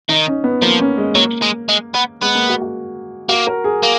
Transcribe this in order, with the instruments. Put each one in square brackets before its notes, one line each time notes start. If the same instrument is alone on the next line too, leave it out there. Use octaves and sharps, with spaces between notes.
[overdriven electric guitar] D#3 [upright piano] D#4
[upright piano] C#4
B3
[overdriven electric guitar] F3 [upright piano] A#3
[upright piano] C#4
G#3
[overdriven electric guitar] F#3 [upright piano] A#3
[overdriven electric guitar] G#3
G#3
B3
[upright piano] G#3 [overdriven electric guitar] B3
[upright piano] A#3
F#4
F#4
[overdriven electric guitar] A#3 [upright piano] F#4
[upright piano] A#4
G#4
[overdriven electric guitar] A#3